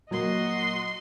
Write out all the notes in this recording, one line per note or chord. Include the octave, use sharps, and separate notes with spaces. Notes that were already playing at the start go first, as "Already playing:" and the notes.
A#2 F#3 A#3 F#4 D#5 C6